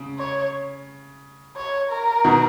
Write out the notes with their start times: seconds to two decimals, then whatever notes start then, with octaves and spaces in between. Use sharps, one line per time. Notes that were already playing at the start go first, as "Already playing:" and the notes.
Already playing: C#3
0.19 C#5
1.57 C#5
1.90 A#4
2.24 B2 D#3